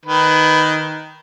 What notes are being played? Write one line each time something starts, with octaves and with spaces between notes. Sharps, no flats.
D#3 B4